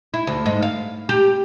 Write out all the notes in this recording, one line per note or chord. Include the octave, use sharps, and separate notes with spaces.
E4
D2
G#2
F5
G4